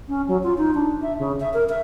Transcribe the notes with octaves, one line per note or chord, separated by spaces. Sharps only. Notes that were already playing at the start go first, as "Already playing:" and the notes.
C#4
F#3
F4
D#4
D4
E5
C#3
E5
A#4
E5